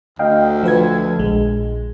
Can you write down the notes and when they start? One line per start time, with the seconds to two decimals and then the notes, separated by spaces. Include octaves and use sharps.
0.19 D2 D#5 F5 G5
0.63 F3 B4 G#6
1.18 A#1 G#3